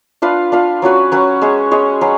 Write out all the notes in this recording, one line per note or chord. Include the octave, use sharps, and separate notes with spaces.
D4 F4 B4 F5
D4 F4 B4 F5
F#3 C#4 F#4 B4
F#3 C#4 F#4 B4
G#3 C#4 G#4 C#5
G#3 C#4 G#4 C#5
F#3 C#4 G#4 B4